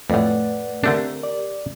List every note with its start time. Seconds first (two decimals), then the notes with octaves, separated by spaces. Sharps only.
0.10 F2 A2 A3 B4 D5 F#5
0.84 D3 A3 C4 D4 G4 A#4
1.23 D5